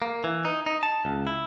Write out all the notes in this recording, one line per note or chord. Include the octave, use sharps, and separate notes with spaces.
A#3
E3
D#4
D#4
A5
C#2
E4